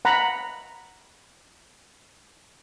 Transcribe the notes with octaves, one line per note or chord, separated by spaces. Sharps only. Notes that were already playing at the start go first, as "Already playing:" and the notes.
F#5 A#5 B5